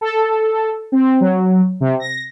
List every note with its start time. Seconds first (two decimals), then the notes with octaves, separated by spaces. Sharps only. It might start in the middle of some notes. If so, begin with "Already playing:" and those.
0.01 A4
0.92 C4
1.20 F#3
1.81 C3
2.00 A#6